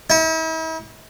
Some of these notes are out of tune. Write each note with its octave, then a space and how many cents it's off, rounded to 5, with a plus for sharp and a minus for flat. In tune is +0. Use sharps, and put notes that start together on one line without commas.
E4 -45